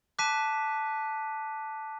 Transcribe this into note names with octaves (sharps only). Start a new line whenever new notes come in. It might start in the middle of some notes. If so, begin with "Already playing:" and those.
A5 D6 F#6 B6 D#7